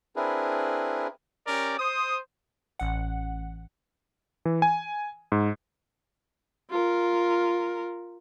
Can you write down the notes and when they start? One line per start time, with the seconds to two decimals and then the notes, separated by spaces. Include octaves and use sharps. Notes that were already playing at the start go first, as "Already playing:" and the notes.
0.16 C4 D4 E4 G#4 A#4 B4
1.47 C#4 G4 A#4 D5
1.78 C5 D#6
2.79 A1 F#5
4.45 E3
4.62 G#5
5.32 G#2
6.70 F4 A#4